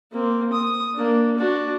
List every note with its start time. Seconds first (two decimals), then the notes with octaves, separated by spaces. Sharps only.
0.11 A#3 C4
0.52 D#6
0.93 A#3 D4
1.36 D4 F#4